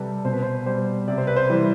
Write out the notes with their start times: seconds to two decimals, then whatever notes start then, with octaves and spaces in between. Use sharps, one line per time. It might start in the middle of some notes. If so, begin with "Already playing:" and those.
Already playing: C3 G3 A4 B4
0.25 B2 C5
0.33 B4
0.43 C5
0.66 G3 C5
1.08 C3 D5
1.18 C5
1.27 B4
1.36 C5
1.50 E3 G3